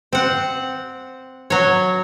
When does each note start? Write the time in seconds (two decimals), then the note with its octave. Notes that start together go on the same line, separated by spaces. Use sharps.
0.13 C4 F#5
1.50 F#3 C#5